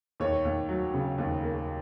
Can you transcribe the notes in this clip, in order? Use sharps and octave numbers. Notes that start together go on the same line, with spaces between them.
D#2 C#5
D#2
F#3
C#3
D#2
A#3